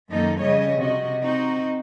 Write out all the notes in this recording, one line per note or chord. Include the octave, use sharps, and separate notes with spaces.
F#2 D#3 A#3 D#4 A4
F2 C#3 G3 C#5 D#5
C3 F#4 D#5
C4 D#4 F#4